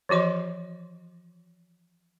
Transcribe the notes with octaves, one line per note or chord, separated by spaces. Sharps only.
E3 F3 F#4 D#5 C6